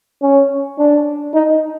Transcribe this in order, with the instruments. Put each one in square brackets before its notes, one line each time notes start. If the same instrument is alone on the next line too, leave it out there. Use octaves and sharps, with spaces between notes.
[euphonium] C#4
D4
D#4